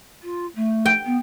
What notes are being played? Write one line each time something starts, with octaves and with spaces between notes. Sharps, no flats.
F4
A3
G5
B3